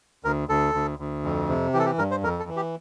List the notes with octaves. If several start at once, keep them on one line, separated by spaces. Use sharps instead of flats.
D2 A#4
D2 A4
D2
D2
F2
C3
E3 G4
A4
G4
G2 A#4
C5
F2 A#4
A4
E3
G4